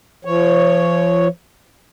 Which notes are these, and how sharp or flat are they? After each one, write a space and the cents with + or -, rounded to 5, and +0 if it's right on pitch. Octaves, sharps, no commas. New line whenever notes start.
F3 -30 C#5 +0